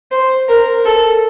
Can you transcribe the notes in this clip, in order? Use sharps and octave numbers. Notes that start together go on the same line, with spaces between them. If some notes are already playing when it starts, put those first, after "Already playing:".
C5
A#4
A4